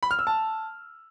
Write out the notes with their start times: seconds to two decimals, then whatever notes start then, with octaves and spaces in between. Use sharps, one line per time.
0.03 B5
0.11 F6
0.19 E6
0.27 A5